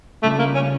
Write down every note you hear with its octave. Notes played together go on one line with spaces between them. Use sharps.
C#3 G3 A3 D4 F4
A#3
C#4